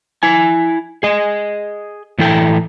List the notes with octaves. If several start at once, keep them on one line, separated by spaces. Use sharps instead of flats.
E4 G#5
G#4 D#5
A2 E3 E4 A4 G5